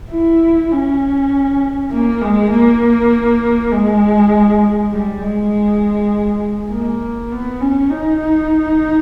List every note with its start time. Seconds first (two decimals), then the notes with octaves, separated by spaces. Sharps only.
0.11 E4
0.72 C#4
1.91 A#3
2.22 G#3
2.51 A#3
3.72 G#3
4.92 G3
5.21 G#3
6.70 A#3
7.32 B3
7.61 C#4
7.90 D#4